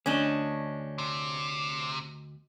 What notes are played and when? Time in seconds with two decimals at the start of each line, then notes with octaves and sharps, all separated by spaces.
0.06 D2 A3 C#4 D4 D#5
0.98 C3